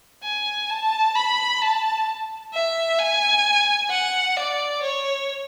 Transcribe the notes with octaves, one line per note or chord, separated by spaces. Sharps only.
G#5
A5
B5
A5
E5
G#5
F#5
D5
C#5